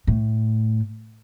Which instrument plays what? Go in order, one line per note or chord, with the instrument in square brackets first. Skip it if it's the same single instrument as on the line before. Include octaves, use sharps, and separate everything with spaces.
[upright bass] A2